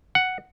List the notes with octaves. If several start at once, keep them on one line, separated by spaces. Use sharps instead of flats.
F#5